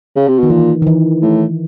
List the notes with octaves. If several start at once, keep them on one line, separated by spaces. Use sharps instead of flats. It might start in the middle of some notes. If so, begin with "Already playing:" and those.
C#3
C3
B2 D#3
A#2 E3
D#3
E3
A2